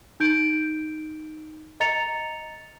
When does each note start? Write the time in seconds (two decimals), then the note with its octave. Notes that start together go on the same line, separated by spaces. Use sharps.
0.20 D#4 G6 D7
1.80 D#5 A#5 A6 C#7 F7